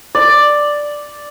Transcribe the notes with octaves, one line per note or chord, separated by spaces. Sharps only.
D5